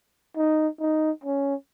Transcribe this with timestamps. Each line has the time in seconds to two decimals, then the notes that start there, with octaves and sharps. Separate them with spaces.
0.37 D#4
0.81 D#4
1.24 C#4